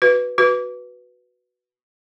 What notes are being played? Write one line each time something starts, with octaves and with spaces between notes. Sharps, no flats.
F#4 B4
F#4 B4